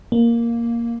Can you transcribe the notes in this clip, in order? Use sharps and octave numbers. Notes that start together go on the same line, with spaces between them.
A#3